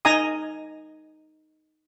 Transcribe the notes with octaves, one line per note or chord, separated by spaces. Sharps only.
D#4 D#5 G#5 A#5 D#6